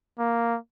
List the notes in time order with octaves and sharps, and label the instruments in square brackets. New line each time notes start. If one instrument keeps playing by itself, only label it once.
[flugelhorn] A#3